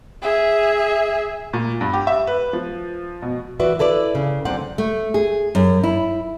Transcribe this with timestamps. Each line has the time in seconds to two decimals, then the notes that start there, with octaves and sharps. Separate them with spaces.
0.22 G#4 E5
1.53 A#2
1.81 G2
1.93 G4
2.07 E5
2.27 B4
2.53 F3
3.22 B2
3.60 E3 F#4 B4 D5 E5
3.79 E4 A4 B4 D5
4.15 C#3
4.45 F#2 D3 C4 D5 F#5
4.78 A3
5.14 G#4
5.55 F#2
5.84 E4